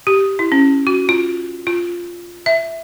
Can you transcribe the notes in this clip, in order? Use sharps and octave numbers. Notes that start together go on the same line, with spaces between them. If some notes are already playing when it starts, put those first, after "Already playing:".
G4
E4
C#4
F#4
F4
F4
E5